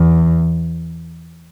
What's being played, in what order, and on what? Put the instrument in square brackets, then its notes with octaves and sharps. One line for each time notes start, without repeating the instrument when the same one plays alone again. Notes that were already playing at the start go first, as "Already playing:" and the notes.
Already playing: [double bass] E2